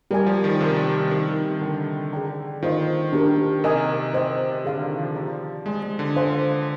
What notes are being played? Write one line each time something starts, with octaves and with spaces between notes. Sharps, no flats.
G3 G4 A#4 D5 G#5
F3
D#3
C3 A#4 D5 G5 C6
D#3
D#3 D#4 G4 A#4
D#3
C3
D3 A#4 D5 G5
G#4 D5 G5 A#5
D#3 F4 C5 D#5
D4 G4 A#4
C3 A#4 D#5 G#5
C5 D#5 G5
C3
D3 G#4 D5 F5 C6
D#3
F3
G4 D5 F5 A#5
G#3 G4 D5 G#5 C6
G#3
D3
C5 F5 G#5 C6